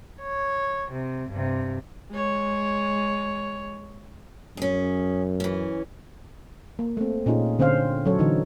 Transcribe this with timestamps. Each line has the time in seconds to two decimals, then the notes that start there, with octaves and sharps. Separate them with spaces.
0.22 C#5
0.91 C3
1.30 G2 C3
2.11 G#3 C#5
4.57 F#2 C#4 G#4
5.40 E3 C#4
6.79 A#3
6.97 A3 C4
7.26 A#2 C#4 D#4 F4 G#4
7.59 D3 C4 C#4 C5 F5
8.06 F#3 C#4 A4 C#5
8.19 D3 E3 D#4